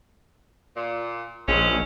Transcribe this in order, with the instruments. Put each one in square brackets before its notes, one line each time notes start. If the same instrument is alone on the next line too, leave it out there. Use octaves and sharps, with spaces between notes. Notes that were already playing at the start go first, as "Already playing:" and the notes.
[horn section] A#2
[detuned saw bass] A#1 [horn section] G#3 C4 C#4